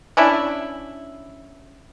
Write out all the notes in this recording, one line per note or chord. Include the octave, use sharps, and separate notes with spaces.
C#4 D4 E4